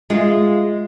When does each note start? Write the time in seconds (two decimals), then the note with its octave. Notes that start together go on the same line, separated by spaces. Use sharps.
0.10 G#3 F4